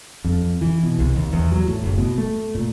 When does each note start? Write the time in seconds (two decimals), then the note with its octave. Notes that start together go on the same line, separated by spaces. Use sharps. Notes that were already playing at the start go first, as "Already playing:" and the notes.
0.24 F2
0.61 E3
0.83 B2
0.99 C2
1.16 D#2
1.32 E2
1.52 F#3
1.68 A2
1.84 F#1
1.98 B2
2.18 A3
2.55 A#2